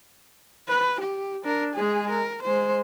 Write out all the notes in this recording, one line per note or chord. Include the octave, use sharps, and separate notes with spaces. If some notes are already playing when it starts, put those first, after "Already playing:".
B4
G4
D4 A#4
G#3 G#4
A#4
G#3 C5